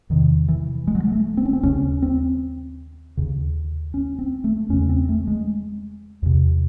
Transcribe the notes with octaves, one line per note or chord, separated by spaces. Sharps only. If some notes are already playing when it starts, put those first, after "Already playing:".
E2 C3 D#3
E3
G#3
F#3
G#3
A3
C4
C#4
C4
D#2 C#3 C#4
C4
D#2 C#3
C#4
C4
A3
E2 C#3 C#4
C4
A3
G#3
E2 C3